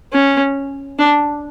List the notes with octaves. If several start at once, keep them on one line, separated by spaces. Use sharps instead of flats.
C#4
D4